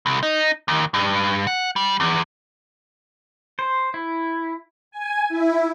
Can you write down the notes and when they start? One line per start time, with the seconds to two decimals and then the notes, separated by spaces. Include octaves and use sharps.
0.06 C2
0.23 D#4
0.68 D#2
0.94 G2
1.47 F#5
1.76 G3
2.00 E2
3.59 C5
3.94 E4
4.91 G#5
5.29 E4